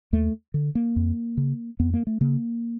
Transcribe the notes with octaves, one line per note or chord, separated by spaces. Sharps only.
D#2 A3
D3
A#3
F2
C#3
F2 B3
A#3
A3
C#3 A#3